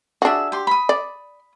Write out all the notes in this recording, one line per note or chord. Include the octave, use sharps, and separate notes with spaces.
D4 F#4 G#4 E5
G4 C6
B5 D#6
D5